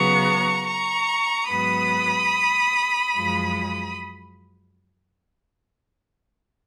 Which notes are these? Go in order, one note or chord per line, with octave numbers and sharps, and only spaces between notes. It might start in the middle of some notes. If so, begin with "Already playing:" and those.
Already playing: C#3 F#3 B3 A#5 C#6
A#5 C#6
G#2 F#3 B3 B5 D#6
F#2 F3 G#3